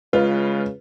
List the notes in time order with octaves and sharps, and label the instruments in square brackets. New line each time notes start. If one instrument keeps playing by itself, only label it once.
[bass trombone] C#3 [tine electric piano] G#3 [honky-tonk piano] F4 [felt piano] B4